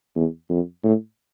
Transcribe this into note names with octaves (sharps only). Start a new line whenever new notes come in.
E2
F2
A2